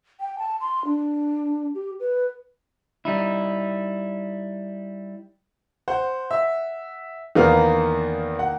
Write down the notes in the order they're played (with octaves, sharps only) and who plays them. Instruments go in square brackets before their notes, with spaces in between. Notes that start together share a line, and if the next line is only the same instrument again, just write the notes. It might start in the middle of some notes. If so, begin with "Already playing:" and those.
[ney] G5
A5
C6
D4
G4
B4
[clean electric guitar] G3 D#4 E4
[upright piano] C5 [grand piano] F#5
[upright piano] E5
[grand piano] E2 B3 F5 [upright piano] D#3 A#3
[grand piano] F#5